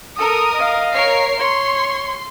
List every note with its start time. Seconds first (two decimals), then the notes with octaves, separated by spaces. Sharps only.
0.19 A4 A#4 D#6
0.54 D#5 F5
0.94 A#4 C#5 C7
1.39 C#5 C6 C#6